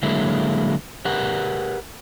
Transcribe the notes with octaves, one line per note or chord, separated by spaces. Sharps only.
D3 F#3 G#3 A#3 E4
G4 A#4 B4 F#5